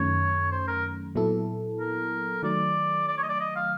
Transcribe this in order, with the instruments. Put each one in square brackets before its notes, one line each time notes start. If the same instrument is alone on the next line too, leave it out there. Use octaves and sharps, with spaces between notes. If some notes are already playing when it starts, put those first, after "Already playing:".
Already playing: [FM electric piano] F#2 D#3 F#3 A3 C#4 [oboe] C#5
[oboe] C5
A#4
[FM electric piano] A#2 F#3 B3 E4 A4
[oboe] A#4
[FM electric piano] D#3 F#3 A3 [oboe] D5
[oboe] D5
C#5
D#5
D5
D#5
F5